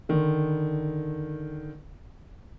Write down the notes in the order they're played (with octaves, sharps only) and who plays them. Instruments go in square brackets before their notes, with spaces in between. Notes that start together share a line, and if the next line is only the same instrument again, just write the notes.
[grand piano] D3 D#3